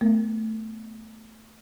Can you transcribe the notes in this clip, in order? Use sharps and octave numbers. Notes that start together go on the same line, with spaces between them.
A3 B3 A#4